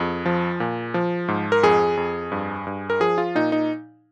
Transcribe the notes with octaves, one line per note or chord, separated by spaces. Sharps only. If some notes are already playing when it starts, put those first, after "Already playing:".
Already playing: F2 G#4
F3
A#2
F3
G#2
A#4
F2 G#4
F2
G2
G2
A#4
F3 G#4
F4
A#2 D#4
D#4